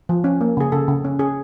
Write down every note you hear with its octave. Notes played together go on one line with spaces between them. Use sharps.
F3
C#4
A#3
C#3 G#4
C#3 A4
C#3
C#4
C#4 G#4